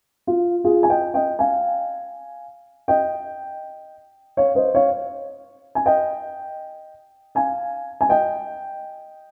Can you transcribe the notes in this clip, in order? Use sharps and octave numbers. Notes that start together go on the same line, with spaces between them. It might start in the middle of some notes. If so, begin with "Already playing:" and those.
F4
F4 G#4
G#5
D#5 G5
D#5 G5
F5 G#5
D#5 G5
C#5 F5
C5 D#5
C#5 F5
G#5
D#5 G5
F5 G#5
G#5
D#5 G5